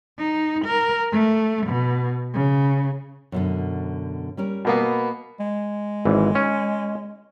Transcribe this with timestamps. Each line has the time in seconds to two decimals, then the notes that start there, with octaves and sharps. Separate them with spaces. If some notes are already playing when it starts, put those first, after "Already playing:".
0.18 D#4
0.65 A#4
1.12 A3
1.67 B2
2.34 C#3
3.32 F#2 B2 D3
4.37 G3 C#4 A#4
4.65 B2 A#3 B3
5.40 G#3
6.05 G#1 E3
6.35 C#4